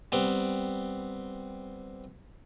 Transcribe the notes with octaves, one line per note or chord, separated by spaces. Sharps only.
G3 B3 C4